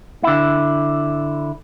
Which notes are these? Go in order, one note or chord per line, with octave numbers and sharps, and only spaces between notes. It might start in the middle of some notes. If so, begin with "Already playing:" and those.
D3 E4